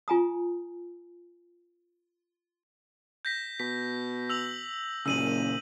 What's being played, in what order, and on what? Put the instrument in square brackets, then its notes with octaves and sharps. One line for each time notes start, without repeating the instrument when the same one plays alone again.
[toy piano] F4 G#5 A#5 D#6
[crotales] G6 A#6 B6
[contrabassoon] B2 [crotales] B6
[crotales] E6 F7 F#7
[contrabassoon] F#1 [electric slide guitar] A#2 C#3 [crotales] E6 D#7 F#7